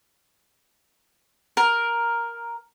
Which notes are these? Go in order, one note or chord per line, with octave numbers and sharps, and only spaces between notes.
A#4